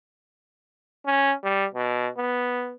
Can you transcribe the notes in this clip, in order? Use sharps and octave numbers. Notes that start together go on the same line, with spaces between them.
C#4
G3
B2
B3